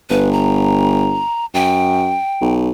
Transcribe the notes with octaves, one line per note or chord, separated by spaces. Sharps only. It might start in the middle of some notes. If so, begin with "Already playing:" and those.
G1 B4
A#5
F#2 G5
B1